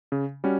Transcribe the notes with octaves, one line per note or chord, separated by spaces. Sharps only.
C#3
G3 C#4 F#4